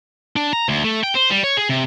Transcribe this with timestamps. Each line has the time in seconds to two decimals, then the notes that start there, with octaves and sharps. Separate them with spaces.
0.36 D4
0.53 A#5
0.69 D2
0.84 A3
1.04 G5
1.15 C5
1.30 G3
1.44 C#5
1.57 G#4
1.69 C3